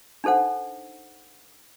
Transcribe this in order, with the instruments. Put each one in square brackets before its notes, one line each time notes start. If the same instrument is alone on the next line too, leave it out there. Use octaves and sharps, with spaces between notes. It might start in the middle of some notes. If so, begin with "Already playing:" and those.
[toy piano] D4 D#4 A4 C5 F#5